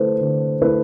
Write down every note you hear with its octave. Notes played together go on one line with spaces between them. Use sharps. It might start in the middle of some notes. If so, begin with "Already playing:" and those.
Already playing: D3 A3 E4 B4 C5
D3
A3 E4 B4